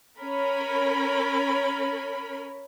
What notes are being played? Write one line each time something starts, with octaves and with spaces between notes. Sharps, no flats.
C#4 A#4 B5